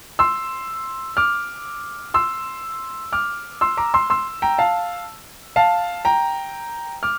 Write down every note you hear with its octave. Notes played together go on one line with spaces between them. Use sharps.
C6 E6
D6 F6
C6 E6
D6 F6
C6 E6
A#5 D6
C6 E6
C6 E6
G5 A#5
F5 A5
F5 A5
G5 A#5
D6 F6